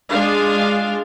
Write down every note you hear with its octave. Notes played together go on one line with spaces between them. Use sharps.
G#3 D4 F4 F5